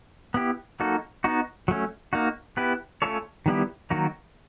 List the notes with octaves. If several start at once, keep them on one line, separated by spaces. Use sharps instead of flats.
B3 E4 G4
F#3 A#3 D#4 F#4 A4
B3 D#4 F#4
F#3 A3 C#4
A#3 D#4 F#4
B3 E4 G4 B4
A3 C#4 F4 A4 C#5
D#3 G3 B3 E4 G4
D#3 F#3 A#3 D#4 F#4